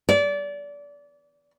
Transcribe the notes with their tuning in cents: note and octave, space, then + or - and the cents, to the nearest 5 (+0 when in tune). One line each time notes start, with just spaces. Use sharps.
D5 -25